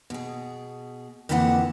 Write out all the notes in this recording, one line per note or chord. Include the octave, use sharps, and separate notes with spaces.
B2 G#4
F2 A#2 D3 E3 A4 F#5